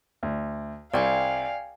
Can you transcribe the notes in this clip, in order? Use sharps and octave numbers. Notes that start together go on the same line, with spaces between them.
D2
C2 D5 F5 G5 G#5